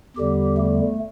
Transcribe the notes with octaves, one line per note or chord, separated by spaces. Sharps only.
E2 D3 G3 G4
A3